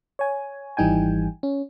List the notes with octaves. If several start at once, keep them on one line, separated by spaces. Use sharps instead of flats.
C#5 G#5
G#1 E3 G3 D#4 G5 G#5
C#4